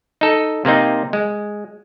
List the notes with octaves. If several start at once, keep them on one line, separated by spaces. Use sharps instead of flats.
D#4 A4
C3 A#3 C4 D#4
G#3